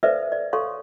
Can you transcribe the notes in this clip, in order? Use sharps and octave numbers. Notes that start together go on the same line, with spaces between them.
A4 B4 C5 D5 E5 F5
D5
A4 C#5 F5 C6 C#6